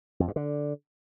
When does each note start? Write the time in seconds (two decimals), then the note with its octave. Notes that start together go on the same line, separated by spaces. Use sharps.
0.20 F2
0.28 G2
0.36 D3